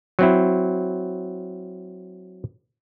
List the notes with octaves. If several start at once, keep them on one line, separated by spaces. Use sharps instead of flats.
F#3 C4 E4